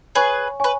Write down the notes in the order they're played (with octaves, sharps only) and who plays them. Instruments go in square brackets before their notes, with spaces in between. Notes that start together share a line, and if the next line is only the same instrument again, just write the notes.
[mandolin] G#4 B4 [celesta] C#5 G#5 C#6
[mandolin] B4 [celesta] C#5 G#5 C#6